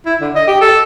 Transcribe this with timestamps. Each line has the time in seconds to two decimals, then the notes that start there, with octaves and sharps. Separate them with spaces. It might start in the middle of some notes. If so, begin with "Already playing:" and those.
0.06 E4
0.21 D3
0.35 D#5
0.47 G4
0.61 A4